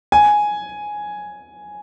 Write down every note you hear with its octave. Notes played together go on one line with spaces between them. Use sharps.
G#5